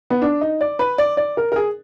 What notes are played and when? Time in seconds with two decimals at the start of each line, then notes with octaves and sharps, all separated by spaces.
0.10 B3
0.22 D4
0.41 D#4
0.61 D5
0.79 B4
0.98 D5
1.17 D5
1.37 A#4
1.52 A#4
1.56 G#4